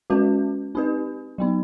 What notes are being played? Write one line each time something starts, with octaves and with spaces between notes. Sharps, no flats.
G#3 C#4 F#4 B4
C4 D#4 G4 B4
F#3 B3 D#4